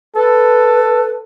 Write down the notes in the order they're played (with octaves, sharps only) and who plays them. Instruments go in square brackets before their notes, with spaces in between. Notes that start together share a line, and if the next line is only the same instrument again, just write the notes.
[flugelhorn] A4 [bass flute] B4